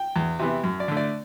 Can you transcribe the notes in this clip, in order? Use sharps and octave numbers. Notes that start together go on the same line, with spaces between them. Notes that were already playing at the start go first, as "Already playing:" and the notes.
Already playing: G5
E2
C3 E3 B3
F#2
D5
D3 A3
D5